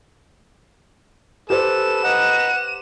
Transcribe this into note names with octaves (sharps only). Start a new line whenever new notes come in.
G4 A4 B4 C5 E7
B4 D#5 F#5 A#5